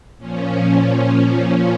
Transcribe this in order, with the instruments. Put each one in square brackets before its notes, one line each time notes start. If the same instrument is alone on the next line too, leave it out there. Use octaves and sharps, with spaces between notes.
[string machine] A#2 F3 C#4